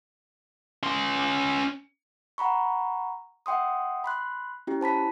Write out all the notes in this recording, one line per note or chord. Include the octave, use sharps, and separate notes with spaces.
C#4 C6
F#5 A#5 B5 C#6
E5 F#5 G5 C6 D#6
B5 C6 F#6
C#4 E4 G4
C5 A5 B5 B6